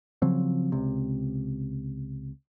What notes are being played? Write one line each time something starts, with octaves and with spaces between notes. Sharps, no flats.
C#3 F3 F#3 C4
C#2 C3